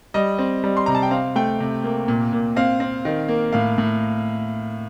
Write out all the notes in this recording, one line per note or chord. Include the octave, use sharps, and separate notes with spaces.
G3 D#5
C4
G3
C6
C3 A#5
A5
G5
C4 F5
A3 G5
C3
A#3
A#2
A#2
C4 F5
C4
D#3
A#3
A2 F5
A2